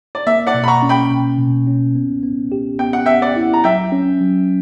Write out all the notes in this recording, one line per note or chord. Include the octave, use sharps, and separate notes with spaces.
D5
A#3 E5
D5 F#5
B2
B5
A#5 C#6
C#4
G5 B5
B2
B2
C#4
B3
B3
G4
B3 G5
F#5
B3 E5 G5
D5 F#5
E4
A#5
F#3 E5 G5
C#4
F#3